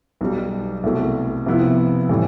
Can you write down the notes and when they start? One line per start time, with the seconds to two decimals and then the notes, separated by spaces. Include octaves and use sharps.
0.21 B1 B2 G3
0.83 C2 B2 A3
1.46 C3 F3 B3 E4
2.09 A2 E3 G3